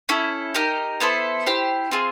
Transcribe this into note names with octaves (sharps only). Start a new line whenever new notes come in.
C#4 E4 A4
D#4 G4 A#4
B3 E4 A4 C5
E4 G4 C5
C4 F4 G#4